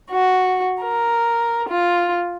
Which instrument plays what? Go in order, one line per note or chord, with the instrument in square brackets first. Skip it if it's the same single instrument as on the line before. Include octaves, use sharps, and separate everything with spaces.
[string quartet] F#4
A#4
F4